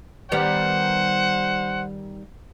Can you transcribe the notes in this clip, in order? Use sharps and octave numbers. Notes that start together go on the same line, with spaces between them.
D#3 G3 B3 C5 F#5